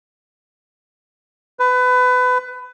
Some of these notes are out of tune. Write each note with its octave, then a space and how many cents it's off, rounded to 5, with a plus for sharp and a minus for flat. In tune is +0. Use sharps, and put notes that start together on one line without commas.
B4 +25